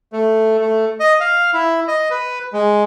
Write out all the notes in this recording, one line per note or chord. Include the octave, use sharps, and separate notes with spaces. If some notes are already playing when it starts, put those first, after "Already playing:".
A3
A3
D#5
F5
E4
D#5
B4
G#3